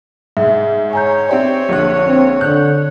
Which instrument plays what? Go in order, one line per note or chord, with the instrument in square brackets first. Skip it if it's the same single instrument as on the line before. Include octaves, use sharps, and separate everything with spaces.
[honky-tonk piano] G#2 [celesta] E5
[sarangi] C#5 [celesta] G#5 A#5 G6
[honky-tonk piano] C4 G4 C5 [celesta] D5 E5
[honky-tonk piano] A#1 D3 F#6
[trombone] C4
[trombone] D3 [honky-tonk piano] F#6 [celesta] G6